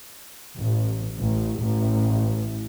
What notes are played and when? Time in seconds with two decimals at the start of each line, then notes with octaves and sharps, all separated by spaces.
0.58 A1
1.20 A1
1.59 A1